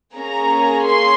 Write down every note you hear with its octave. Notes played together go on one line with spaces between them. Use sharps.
A#3 C#4 G#4 A#5
C6